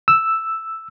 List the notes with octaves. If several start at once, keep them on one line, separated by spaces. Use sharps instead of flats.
E6